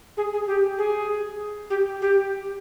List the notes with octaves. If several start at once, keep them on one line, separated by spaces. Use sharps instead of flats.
G#4
G#4
G4
G#4
G4
G4